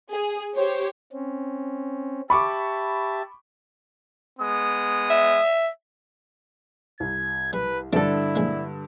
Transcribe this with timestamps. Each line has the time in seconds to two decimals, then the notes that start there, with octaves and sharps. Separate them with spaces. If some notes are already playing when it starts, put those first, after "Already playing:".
0.11 G#4
0.55 G4 C5 C#5
1.13 C4 C#4
2.30 G4 E5 A5 B5 C#6 D6
4.40 G#3 B3 D#6
5.10 E5
7.00 C2 G#6
7.53 G3 B4
7.93 G2 D3 E3 F3 A3 D4 E4 A4
8.35 F3 G#3 A#3